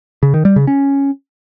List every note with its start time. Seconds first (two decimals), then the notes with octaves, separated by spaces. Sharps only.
0.23 C#3
0.34 D#3
0.45 G3
0.56 C#3
0.67 C#4